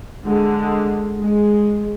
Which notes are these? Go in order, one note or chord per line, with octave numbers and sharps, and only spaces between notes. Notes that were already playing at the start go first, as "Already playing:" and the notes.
D3 G#3
G#3